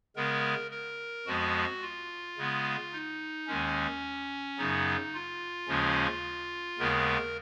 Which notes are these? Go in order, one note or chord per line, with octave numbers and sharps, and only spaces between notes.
C#3 G#3 B3 A#4
A#4
F2 F3 G#3 B3 F#4
F4
C#3 G#3 B3
D#4
D#2 D#3 G#3 C#4
F#2 C#3 F#3 B3 D#4
F4
D#2 C#3 F3 G#3 C#4
D#2 C#3 G#3 B3 A#4